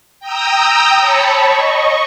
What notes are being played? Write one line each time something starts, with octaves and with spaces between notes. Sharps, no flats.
G5 A#5 D#6 E6
C#5 A5 B5 C#6
D#5 C#6